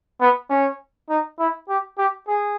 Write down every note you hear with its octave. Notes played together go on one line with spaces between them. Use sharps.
B3
C#4
D#4
E4
G4
G4
G#4